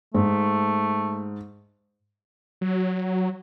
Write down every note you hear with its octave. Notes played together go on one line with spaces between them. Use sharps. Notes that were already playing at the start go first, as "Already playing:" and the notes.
G#2 A3
F#3